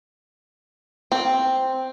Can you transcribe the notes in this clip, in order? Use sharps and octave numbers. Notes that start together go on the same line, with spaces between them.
C4